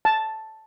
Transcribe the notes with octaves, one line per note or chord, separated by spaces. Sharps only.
A5